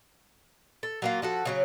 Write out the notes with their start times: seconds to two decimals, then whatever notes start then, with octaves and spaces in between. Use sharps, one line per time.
0.83 A4
1.02 F#3 A#3 F4
1.22 F3 F#4 A4
1.45 C#3 F#3 C#4